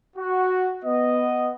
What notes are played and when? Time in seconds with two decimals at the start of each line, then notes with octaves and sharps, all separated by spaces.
0.17 F#4
0.84 B3 D#5